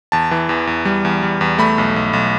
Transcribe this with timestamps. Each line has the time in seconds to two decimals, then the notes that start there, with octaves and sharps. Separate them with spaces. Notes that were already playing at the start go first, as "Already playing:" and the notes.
0.12 E2 A5
0.31 E3
0.49 E2
0.67 E2
0.85 G3
1.05 E2
1.22 G3
1.41 E2
1.59 A3 B5
1.78 B1
1.96 B1
2.13 B1